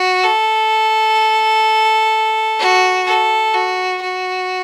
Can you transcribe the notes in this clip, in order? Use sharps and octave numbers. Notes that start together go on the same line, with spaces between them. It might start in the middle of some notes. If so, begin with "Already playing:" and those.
Already playing: F#4
A4
F#4
A4
F#4
F#4